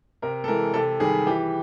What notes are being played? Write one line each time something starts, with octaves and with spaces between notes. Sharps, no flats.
C3 A#4
A4
E3 G#3 A#4
C3 A4
D#3 G3 G#4
E3 G4